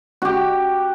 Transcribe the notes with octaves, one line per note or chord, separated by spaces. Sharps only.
F#4 G4